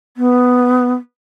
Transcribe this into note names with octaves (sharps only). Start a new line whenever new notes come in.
B3